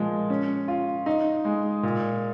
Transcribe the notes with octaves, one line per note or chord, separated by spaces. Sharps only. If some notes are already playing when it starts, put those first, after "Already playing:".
Already playing: A#2 F3 G#3
C#4
F4
D#4
G#3
A#2